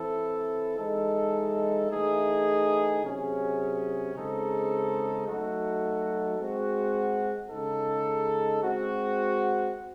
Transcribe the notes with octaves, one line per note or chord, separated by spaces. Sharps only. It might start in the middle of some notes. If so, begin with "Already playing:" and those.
Already playing: E3 C4 E4 A4
E3 G#3 D#4 A4
E3 A3 D#4 G#4
C3 F#3 C#4 G#4
C#3 G#3 C4 D#4 A4
F#3 A3 D#4 F#4 A4
G#3 C4 F#4
C#3 G#3 D#4 A4
G#3 C4 F#4